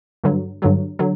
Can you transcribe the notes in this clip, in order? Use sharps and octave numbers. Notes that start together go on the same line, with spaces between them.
G2 D3 F#3
G2 D3 F#3
D3 F#3